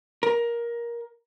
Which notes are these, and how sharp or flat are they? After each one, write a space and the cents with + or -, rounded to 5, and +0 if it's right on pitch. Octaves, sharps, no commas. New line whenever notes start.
A#4 +15